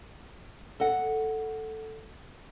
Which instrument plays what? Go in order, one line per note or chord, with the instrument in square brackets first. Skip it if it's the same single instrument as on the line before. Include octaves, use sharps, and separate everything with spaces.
[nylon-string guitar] A4 D#5 F#5